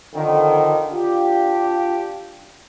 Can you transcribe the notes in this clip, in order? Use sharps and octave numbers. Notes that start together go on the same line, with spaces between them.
F2 D3 D#3
D4 F4 G4